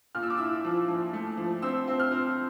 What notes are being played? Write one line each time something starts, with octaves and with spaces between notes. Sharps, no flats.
A#2 F6
E6
D6
E4 E6
F3
F3
A3
F3
C4 E6
C4
F6
C4